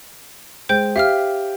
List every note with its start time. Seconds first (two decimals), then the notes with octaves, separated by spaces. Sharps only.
0.69 G#3 C5 G5 G6
0.96 G4 E5 F5 F6